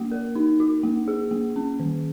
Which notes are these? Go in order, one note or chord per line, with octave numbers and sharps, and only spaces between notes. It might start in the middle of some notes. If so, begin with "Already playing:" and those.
Already playing: A#3 F#4
A#4
D#4
F#4
A#3
G#4
A#3
C#4
D#3